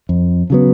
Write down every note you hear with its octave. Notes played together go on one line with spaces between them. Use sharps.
F2
C#3 F#3 B3